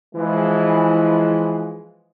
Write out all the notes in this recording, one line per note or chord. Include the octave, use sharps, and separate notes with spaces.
E3 F3 G#3